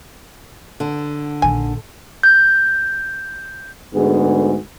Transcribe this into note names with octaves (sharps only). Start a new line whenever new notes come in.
D3
A#1 D#3 G#5
G6
G#2 D3 A3 B3 F#4 G#4